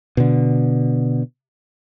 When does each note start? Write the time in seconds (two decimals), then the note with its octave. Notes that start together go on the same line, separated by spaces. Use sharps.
0.17 B2 D3